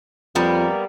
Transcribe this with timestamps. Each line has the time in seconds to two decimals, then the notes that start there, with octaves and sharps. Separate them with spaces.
0.35 F2 G3 A#3 B3